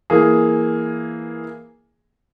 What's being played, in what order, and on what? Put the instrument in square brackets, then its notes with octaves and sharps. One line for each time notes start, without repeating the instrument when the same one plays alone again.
[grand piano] E3 A#3 G#4